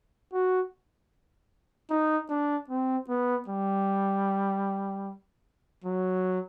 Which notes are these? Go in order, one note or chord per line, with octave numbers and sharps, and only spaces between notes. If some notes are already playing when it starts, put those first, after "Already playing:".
F#4
D#4
D4
C4
B3
G3
F#3